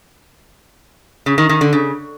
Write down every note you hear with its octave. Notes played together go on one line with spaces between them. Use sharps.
C#3
D#3
D#3
D3
C#3